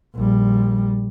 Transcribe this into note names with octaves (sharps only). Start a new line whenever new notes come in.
A#1 G3